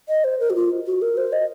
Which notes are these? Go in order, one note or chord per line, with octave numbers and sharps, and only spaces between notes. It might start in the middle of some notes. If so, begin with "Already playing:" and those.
D#5
C5
A#4
F#4
F4
F#4
A#4
C5
D#5